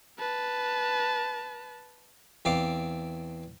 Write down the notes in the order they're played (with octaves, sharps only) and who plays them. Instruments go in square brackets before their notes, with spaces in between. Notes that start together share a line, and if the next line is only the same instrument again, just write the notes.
[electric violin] B4 A5
[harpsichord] E2 C4 D5 F5 D6